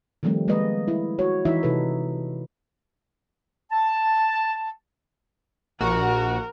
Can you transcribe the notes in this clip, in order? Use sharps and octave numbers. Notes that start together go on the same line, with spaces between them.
D#3 F3 G3 A3 C4
G#3 A#3 B4 D#5
E4
F#4 C#5
E3 D#4 E4 E5
C3 D#4 A4 B4
A5
A#1 F#4 A#4